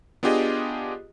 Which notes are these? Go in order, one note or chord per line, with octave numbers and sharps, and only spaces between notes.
B3 D4 F4 G4 G#4 D#5